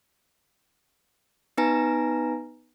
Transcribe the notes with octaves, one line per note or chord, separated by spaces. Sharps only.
B3 D#4 B4 G#5 A#5 A#6